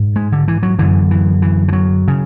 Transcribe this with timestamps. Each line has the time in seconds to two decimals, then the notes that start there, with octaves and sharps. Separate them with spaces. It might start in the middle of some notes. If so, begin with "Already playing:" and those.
Already playing: G#2
0.16 G#3
0.32 D3
0.48 E3
0.63 F#3
0.79 F#2 D3 E3
1.11 E3
1.42 E3
1.68 E3
1.73 F#3
2.08 C#3